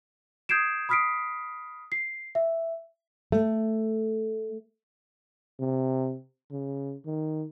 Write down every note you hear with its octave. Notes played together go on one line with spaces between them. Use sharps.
D#6 G6 G#6 C7 D7 E7
B5 D#6 F6 B6 C7 D7
C7
E5
A3
C3
C#3
D#3